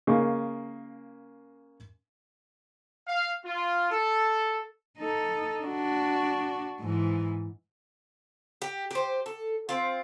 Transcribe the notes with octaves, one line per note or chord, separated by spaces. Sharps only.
C#3 A#3 D#4 G#4
F5
F4
A4
D#4 A4
D4 F#4
G#2 E3
G4
G4 C5
A4
C4 F4